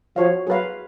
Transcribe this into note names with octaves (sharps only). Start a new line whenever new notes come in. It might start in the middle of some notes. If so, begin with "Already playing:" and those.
F3 F#4 C#5 F5
F#3 G#4 B4 F5